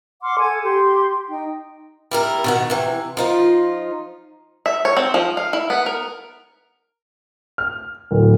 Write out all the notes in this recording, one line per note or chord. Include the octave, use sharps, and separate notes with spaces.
F#5 C6 D6 F6
A4 F#5 G#5 G#6
G4 C6 G6
D#4 G5
G3 E4 A#4
B2 D#3 F#5
C3 E3
F3 D#4 F4
E5
C#5
C4
F3
F5
E4
B3
A#4
F6
D1